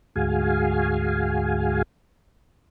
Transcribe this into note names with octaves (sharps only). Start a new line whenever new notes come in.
D2 G#2 F#4 G#4 F5 G#5